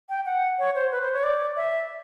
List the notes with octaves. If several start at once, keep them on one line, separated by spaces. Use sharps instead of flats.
G5
F#5
C#5
C5
B4
C5
C#5
D5
E5